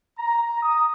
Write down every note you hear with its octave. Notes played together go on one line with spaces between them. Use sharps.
A#5
D#6